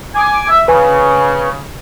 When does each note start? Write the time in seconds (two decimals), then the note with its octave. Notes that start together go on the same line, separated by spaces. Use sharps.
0.15 G#5 D6
0.49 E5
0.68 C#3 B4 G#5